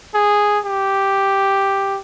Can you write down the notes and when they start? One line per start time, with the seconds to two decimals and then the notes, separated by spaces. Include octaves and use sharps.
0.15 G#4
0.65 G4